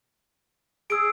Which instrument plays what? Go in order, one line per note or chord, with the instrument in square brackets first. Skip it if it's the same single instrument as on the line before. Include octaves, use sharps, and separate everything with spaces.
[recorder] G#4 [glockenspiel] E6 D7